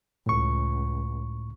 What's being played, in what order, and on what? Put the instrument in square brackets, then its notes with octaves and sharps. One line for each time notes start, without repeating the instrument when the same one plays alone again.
[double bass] C#2 [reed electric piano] A2 C#6